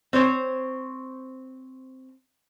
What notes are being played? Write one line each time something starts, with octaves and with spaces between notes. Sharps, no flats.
C4 C5 C#5